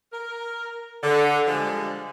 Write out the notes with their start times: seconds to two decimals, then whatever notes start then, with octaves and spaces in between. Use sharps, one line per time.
0.13 A#4
1.03 D3
1.47 D3 F3 G3 G#3